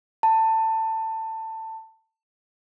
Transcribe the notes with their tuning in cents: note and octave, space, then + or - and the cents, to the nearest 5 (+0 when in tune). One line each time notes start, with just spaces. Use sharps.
A5 +20